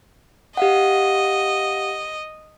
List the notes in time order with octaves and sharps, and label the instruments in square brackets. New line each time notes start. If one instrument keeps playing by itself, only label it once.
[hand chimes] G4 F5 F#5 [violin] D#5